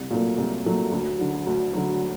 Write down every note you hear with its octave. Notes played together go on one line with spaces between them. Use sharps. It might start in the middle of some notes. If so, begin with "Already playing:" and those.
Already playing: C2
A#2 F#3 A3
C2
A#2 F#3 A3
D2
D3 F#3
D2
D3 F#3